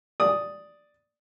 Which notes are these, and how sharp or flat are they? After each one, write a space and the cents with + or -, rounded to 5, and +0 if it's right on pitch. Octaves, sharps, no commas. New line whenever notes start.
D5 +0 D#6 +0